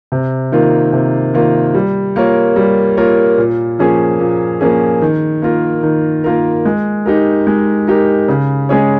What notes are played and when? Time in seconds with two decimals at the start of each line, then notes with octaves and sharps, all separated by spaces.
0.12 C3
0.52 D#3 A#3 F4
0.93 C3
1.34 D#3 A#3 F4
1.74 G3
2.16 A#3 F4 A#4 C#5
2.56 G3
2.97 A#3 F4 A#4 C#5
3.38 A#2
3.79 F3 A#3 C#4 G#4
4.20 A#2
4.61 F3 A#3 C#4 G#4
5.02 D#3
5.42 A#3 F4 A#4
5.83 D#3
6.24 A#3 F4 A#4
6.65 G#3
7.06 D#4 G4 A#4
7.47 G#3
7.87 D#4 G4 A#4
8.28 C#3
8.69 G#3 C#4 G#4 C#5